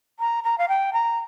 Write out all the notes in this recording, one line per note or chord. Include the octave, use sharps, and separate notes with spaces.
A#5
A#5
F5
G5
A#5